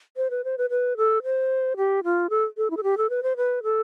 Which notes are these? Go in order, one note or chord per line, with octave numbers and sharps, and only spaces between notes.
C5
B4
C5
B4
B4
A4
C5
G4
F4
A4
A4
E4
A4
G4
A4
B4
C5
B4
A4